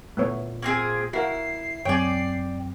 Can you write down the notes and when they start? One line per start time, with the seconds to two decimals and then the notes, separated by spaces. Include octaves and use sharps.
0.17 A#2 A3 B3 C#5
0.62 A#3 C4 G#4
1.13 E4 F#4 A#4 F5 C7
1.85 F#2 F#3 C4 C#5 D5 G5 G#5